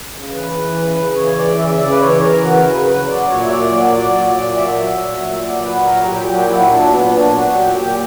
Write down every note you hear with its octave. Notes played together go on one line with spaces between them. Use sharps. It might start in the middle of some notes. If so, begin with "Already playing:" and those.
C#3
E3 B4
E3
C#3
C#3
E3 C#5
E3 D5
C#3 E5
E5
C#3 D5
B4
E3 C#5
E3 A#4
C#3 F#4
A#4
C#3 B4
F#3 B4
F#3 D5
A#2 C#5
E5
A#2 D5
F#3 D5
F#3 D5
A#2 D5
A#2 D5
F#3 E5
F#3
A#2
A#2
F#3 D5
F#3 B4
A#2 A#4
A#2 G4
F#3 G4
F#3 E4
A#2 D4
A#2 B3
F#3 D4
F#3 F#4
A#2 G4
A#2 G4